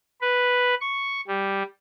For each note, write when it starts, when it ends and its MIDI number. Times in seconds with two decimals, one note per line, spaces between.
0.21 0.74 71
0.81 1.20 85
1.28 1.63 55